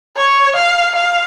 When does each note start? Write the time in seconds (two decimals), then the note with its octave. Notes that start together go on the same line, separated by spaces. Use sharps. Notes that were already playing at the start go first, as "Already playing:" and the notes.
0.16 C#5
0.56 F5
0.96 F5